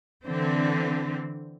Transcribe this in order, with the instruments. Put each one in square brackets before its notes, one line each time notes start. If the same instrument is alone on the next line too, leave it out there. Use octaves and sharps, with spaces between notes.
[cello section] D3 E3 C4